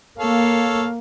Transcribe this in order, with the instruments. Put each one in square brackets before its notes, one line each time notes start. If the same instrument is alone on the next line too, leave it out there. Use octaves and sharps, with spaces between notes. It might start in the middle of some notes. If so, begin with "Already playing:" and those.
[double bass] A#3 [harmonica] A4 C#5 F5